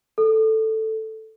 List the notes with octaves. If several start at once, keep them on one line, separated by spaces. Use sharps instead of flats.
A4